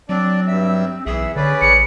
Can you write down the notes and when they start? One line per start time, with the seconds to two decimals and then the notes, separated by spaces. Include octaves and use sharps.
0.09 F#3 C4 D4 D5
0.48 G2 E5
1.06 B1 E2 G#4 E5
1.36 D3 C#4 B4 D5
1.62 A1 G#4 C#7